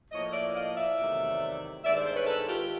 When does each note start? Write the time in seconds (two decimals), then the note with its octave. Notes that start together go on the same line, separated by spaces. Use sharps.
0.11 A2 F3 A#3 C#5 D#5
0.33 D5 E5
0.55 D#5 F5
0.76 D5 E5
0.98 E2 C3 D#3 F#3 A3
1.84 G2 D#3 G#3 B3 D5 E5
1.95 C5 D5
2.05 C5 D5
2.16 B4 C#5
2.27 A4 B4
2.48 F4 G4